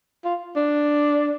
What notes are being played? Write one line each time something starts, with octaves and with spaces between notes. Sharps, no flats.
F4
D4